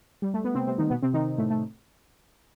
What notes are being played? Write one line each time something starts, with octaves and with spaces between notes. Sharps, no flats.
G3
A3
B3
C3 C4
C3 C4
D#3 D#4
B2 B3
C3 C4
D#3 D#4
A2 A3
A3